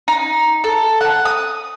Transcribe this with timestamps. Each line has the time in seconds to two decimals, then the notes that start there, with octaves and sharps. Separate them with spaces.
0.08 D#4
0.64 A4
1.01 F#5
1.25 D#6